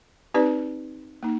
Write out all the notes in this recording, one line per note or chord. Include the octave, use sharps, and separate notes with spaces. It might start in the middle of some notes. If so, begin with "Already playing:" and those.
C4 D#4 G4 B4 D5
A#3 D#4